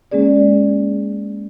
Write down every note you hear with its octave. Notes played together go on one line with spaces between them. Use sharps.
G#3 A#3 C#4 G#4 D5